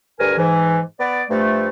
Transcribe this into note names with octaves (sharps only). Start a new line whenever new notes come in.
D2 G2 A#4 G#5
G#2 E3
B3 D5
G2 F3 A3